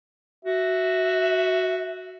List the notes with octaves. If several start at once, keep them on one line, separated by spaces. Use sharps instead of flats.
F#4 E5